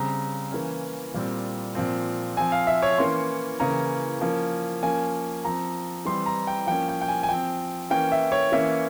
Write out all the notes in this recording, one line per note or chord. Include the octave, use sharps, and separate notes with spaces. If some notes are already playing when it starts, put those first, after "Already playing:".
Already playing: C#3 G3 C4 A#5
E3 A#3 C#4
A#2 G3 C4
A#2 F3 C4
F3 C4 G#5
F5
E5
C#5
E3 A#3 C#4 C6
C#3 E3 A#3 C#4 A#5
F3 A#3 C#4
F3 A#3 C#4 G#5
F3 C4 A#5
E3 G3 C4 C6
A#5
G5
F3 A#3 C#4 G5
G5
G5
G#5
G#5
F3 C4 G5
E3 A#3 C#4 G5
E5
C#5
E3 A#3 C#4 E5